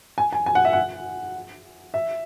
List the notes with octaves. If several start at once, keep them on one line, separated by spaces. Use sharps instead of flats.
G#5
G#5
G#5
F#5
E5
F#5
E5